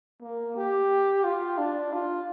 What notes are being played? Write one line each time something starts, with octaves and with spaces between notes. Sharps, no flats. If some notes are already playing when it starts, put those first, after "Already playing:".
A#3
G4
F4
D4
F4